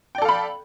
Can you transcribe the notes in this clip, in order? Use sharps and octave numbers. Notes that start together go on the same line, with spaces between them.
A4 D5 F5 G5 B5